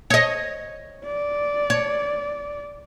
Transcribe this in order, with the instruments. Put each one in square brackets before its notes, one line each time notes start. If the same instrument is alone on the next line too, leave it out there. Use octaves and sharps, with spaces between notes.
[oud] C#5 D#5
[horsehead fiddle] D5
[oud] C#5